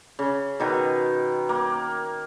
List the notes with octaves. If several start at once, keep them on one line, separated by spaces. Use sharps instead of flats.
C#3
B2 D#3 B4
A#3